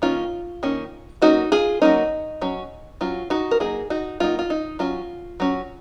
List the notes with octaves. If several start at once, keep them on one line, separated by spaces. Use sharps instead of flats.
D#3 A#3 C#4 F4
D#3 A#3 C#4
F#3 A#3 C#4 D#4 F#4
F4 G#4
F#3 A#3 C#4 D#4
F#3 C#4
F#3 C#4 F4
D#4 F#4
A#4
F#3 A#3 D#4 F4 G#4
D#4 F#4
F#3 A#3 D#4 F4
F4
D#4
F#3 C#4 F4
F#3 C#4